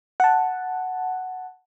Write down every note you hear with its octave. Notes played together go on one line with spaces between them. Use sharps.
F#5 A5